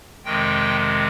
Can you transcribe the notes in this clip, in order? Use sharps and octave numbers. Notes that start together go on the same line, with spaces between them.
F2 C3 D#3 G#3 G5